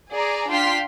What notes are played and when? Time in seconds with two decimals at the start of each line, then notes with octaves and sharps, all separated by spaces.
0.12 G#4 D5 A#5
0.50 D4 F4 G5 C6 F6 B6